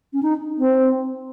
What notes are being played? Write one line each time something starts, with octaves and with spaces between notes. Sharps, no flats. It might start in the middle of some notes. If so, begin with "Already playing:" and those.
C#4
D#4
C4